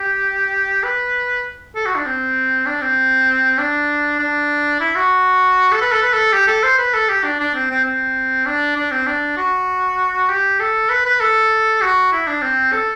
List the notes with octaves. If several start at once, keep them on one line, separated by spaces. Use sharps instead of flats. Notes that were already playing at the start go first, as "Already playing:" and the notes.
Already playing: G4
B4
A4
F#4
D4
C4
D4
C4
D4
D4
E4
F#4
A4
B4
A4
B4
A4
G4
A4
C5
B4
A4
G4
D4
D4
C4
C4
C4
D4
D4
C4
D4
F#4
G4
A4
B4
B4
A4
F#4
E4
D4
C4
A4